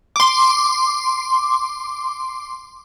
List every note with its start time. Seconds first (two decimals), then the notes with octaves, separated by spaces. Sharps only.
0.16 C6 D6